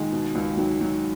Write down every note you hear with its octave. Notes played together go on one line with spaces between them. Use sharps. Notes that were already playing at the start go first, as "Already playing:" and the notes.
Already playing: A#2 D#3 G#3
B2
C#2
D#3 F#3
F#3